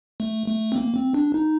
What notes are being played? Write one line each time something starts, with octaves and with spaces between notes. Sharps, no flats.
A3
A3
C4
A#3
C4
D4
D#4